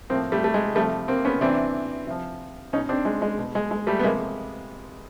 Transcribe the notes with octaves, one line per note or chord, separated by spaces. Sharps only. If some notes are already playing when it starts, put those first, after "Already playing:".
A2 F3 A#3 C4
G3 A3
A3
G#3
C3 F3 G3 A3
A#3 C4
B3 C#4
C3 E3 C4 D4
C3 F3
B2 C#4 D#4
C4 D4
G#3
G#3
B2
G#3
G#3
G3 A3
B3
C3 F3 G#3 A#3